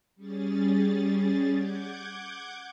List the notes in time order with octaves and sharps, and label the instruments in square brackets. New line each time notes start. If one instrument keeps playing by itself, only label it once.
[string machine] G3 C#4 G#4 A6
F#5 D6 G6 G#6